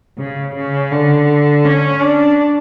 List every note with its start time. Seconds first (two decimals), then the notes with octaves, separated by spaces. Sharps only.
0.19 C#3
0.56 C#3
0.92 D3
1.65 C#4
2.02 D4